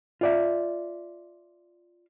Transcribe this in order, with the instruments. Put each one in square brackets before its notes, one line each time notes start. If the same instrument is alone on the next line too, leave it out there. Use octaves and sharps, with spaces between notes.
[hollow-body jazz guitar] F4 D5 E5